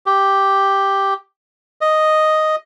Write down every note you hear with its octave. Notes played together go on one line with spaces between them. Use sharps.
G4
D#5